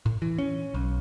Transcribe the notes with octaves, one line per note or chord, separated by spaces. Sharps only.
A2
E3
C#4
B1